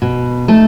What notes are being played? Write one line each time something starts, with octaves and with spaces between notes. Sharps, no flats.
B2
A3 D#4 A4